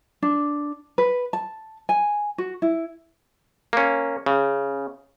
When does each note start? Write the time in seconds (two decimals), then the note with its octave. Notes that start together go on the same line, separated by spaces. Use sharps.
0.22 D4
0.98 B4
1.33 A5
1.89 G#5
2.38 F#4
2.62 E4
3.73 A#3 C#4
4.26 C#3